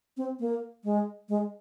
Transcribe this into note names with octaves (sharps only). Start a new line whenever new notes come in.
C4
A#3
G#3
G#3